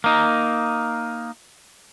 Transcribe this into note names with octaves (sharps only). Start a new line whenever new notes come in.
A#3 D#4